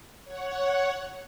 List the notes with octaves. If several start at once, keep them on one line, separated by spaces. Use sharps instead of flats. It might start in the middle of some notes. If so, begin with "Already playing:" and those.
C#5 F#5